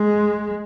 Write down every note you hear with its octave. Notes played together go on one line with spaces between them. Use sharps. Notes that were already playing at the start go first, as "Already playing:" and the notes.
Already playing: G#3